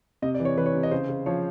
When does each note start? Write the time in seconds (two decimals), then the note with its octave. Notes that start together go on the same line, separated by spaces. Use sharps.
0.22 C3 D#5
0.34 D5
0.40 E3
0.45 C#5
0.57 E3 B4
0.66 C#5
0.75 C3
0.83 D#5
0.91 C#3 C5
1.09 C#3
1.26 F3 C#5